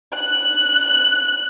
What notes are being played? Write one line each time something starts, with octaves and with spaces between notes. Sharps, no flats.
F#6